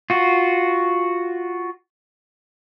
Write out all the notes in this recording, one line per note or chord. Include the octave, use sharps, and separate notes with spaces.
F4 F#4